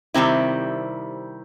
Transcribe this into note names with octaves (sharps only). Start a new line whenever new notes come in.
C3 D#3 G3 C4 E4